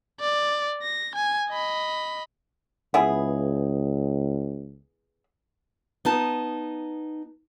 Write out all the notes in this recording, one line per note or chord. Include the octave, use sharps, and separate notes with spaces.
D5
A#6
G#5
D#5 B5
C#2 B3 E4 G#4
B3 D#4 A5